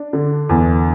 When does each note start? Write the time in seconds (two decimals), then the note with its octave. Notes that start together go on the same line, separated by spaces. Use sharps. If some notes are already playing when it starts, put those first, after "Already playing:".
Already playing: D4
0.13 D3
0.49 E2